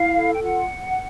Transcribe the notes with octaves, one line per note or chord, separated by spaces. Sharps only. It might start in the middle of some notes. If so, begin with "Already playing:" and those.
Already playing: E4 F5
A4
G5
F4 F#5